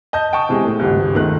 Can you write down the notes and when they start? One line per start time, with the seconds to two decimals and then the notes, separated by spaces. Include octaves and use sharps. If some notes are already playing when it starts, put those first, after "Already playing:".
0.13 D#5 A5 G6
0.33 G5 A5 C#6 D#6
0.49 C3 E3 G#3
0.65 A2 A3
0.80 G#1 C#2 G2
1.13 F#1 C#2 D#3 A3 F#6